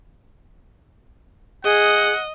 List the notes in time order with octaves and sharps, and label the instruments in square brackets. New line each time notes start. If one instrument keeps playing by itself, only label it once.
[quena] G#4 [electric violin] D#5 [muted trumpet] F#5